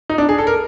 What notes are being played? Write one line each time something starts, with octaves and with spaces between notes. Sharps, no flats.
D#4
D4
G#4
A4
A#4